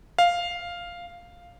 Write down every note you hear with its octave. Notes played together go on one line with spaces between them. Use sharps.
F5